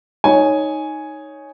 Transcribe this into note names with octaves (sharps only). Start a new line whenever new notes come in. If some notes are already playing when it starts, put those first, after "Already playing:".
D#4 C#5 G#5